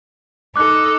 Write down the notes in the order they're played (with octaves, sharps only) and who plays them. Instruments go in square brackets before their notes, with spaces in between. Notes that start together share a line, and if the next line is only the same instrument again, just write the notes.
[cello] D#4 A4 [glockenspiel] D6 F#6